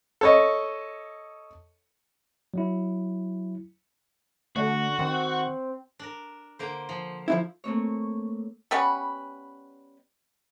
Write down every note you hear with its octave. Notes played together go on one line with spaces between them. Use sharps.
A4 C#5 D#5
F#3 E4
D3 A3 F#4
D#3 C4
D4 A#4
D3 A#3 C5
F3
F3 G3 E4
A3 A#3 C4 C#5
G3 B3 C#4 B4